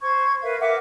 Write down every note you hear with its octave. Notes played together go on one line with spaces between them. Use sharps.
C5 C#6 G#6
A#4 B4 E5 F5
A#4 E5 F#5 D6